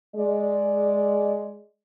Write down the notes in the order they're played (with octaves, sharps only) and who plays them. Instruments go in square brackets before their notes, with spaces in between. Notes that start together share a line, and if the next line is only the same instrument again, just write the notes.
[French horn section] G#3 D5